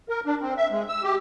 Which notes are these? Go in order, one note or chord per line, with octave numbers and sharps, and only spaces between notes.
A#4
D4
C4
E5
G#3
E6
G4